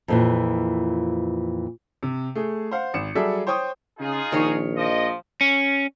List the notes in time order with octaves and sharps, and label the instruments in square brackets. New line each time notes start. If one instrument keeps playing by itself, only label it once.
[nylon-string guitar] F2 A#2 E3
[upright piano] C3
A3 G#4
C5 F5 F#5
G#1 C#7 E7
F#3 G3 G#4 A4 D5 E5
C5 C#5 G5 C#6 D#6
[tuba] C#3 [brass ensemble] D#4 F4 G#4
[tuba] A#1 [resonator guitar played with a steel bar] D#3 C#5
[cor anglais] F3 [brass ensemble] D#5
[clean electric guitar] C#4